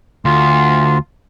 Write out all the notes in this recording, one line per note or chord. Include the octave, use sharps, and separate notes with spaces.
D2 F4